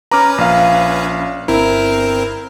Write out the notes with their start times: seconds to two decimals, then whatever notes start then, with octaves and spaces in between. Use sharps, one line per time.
0.11 C#4 B4 A#5 D6 F6
0.38 A#1 F5
1.48 G1 C4 E4 A#4